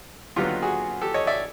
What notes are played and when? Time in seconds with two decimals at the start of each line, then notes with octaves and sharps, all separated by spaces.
0.36 D#2 D3 F#3 B3 F4 G4
0.62 F#4 G#4
1.02 G4 A4
1.14 C#5 D#5
1.27 D5 E5